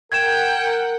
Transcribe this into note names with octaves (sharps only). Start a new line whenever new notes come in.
A#4 F#5 G5 G#6 E7